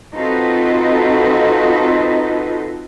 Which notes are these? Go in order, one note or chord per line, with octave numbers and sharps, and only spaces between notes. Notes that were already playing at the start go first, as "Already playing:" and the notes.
C4 D#4 F4 F#4 A4 B4